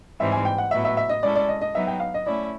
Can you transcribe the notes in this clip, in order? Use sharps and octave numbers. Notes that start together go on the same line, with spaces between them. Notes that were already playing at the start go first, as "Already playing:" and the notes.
G#2 E3 G3 C4 D#4 E5
G#5
G5
F#5
A2 F#3 B3 E4 E5
E5
E5
D#5
G#3 C#4 E4 A4 D5
D5
D#5
D#5
F#3 B3 D#4 E5
G5
F5
D#5
A3 C#4 E4 D5